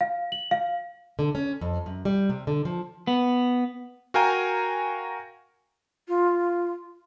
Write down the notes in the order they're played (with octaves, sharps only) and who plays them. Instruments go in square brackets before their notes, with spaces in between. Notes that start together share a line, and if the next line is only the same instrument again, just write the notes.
[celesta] F5
F#7
F5
[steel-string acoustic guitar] D3
C#4
F2
F#2
G3
C3
D3
F3
[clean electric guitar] B3
[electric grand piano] F#4 A#4 F5 G5 G#5 A#5
[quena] F4